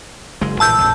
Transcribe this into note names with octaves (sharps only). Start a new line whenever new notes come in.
F#1 G#3
A#1 A2 E3 A5 E6 G6
A#1 F2